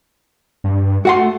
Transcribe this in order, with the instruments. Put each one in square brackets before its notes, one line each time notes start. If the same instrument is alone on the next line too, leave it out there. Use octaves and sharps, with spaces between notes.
[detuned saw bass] G2
[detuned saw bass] A3 [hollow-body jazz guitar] F#4 F#5 C6